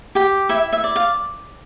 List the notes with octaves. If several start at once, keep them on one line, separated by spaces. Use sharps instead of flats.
G4 G5
E4 E5
E5
D5
F5